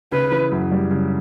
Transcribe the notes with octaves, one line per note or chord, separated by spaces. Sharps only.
C#3 B4
E3
F#2
G3
C#3